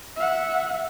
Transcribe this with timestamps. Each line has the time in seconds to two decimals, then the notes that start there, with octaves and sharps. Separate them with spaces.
0.16 E5 F#5